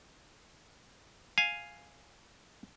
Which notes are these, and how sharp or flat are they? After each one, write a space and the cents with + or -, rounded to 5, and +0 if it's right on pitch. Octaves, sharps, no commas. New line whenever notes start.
F5 +0 G#5 +0